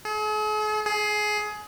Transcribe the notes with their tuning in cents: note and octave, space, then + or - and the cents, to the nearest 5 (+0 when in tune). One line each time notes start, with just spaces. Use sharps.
G#4 +45
G#4 +20